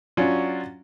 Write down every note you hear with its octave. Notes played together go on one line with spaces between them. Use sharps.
F#3 C#4 D4 F4 F#4